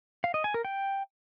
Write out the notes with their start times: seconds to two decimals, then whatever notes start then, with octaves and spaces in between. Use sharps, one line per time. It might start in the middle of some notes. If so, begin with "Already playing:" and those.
0.24 F5
0.34 D#5
0.44 G#5
0.54 A#4
0.65 G5